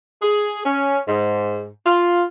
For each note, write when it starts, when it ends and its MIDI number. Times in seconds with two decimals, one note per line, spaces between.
0.23 0.64 68
0.64 1.01 61
1.08 1.66 44
1.86 2.25 65